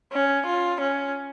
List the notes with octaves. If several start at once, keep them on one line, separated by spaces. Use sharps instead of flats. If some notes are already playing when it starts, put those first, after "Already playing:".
C#4
F4
C#4